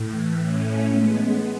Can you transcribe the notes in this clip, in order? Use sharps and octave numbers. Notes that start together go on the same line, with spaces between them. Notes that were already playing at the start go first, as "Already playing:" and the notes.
Already playing: A2
E3
A3 C#4
G#3 B3